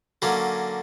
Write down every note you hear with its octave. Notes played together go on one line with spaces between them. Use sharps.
D3 F#3 A#3 C#4